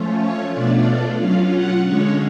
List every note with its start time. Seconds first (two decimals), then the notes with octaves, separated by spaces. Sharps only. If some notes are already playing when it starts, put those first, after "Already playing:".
Already playing: F3 A3 C#4 F4
0.19 C#5
0.53 B2 A3 D4 F4 D5
1.19 F#3 C#4 F4 F5
1.53 F#5
1.86 D3 G#3 C#4 C#5